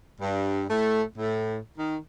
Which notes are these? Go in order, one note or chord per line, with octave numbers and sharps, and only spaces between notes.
G2
A2 A3
A2
D#3